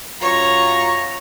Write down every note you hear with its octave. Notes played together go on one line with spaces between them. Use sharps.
F#2 F4 C#5 A#5